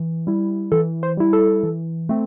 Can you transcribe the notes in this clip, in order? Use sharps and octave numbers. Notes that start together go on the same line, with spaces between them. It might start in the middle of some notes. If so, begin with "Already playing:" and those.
Already playing: E3
G3 E4
E3 A4
C5
G3 E4
A4
E3
A3 C4